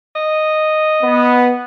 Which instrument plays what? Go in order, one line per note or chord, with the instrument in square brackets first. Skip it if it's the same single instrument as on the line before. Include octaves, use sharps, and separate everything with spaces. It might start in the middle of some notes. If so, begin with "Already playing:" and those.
[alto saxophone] D#5
[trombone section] B3